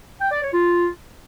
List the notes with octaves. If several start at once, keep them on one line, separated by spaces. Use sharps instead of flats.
G5
D5
C#5
F4